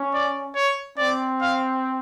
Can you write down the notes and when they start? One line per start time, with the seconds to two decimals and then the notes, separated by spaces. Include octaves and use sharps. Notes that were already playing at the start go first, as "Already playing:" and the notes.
Already playing: C#4
0.14 D5
0.55 C#5
0.98 C4 D5
1.41 F5